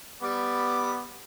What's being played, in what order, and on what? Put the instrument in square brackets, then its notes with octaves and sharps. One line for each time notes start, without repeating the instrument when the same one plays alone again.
[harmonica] G3 D6 [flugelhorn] B3